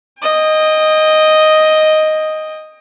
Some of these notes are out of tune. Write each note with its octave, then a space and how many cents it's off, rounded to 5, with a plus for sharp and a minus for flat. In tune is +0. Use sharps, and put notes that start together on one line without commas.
D#5 +0 G5 +35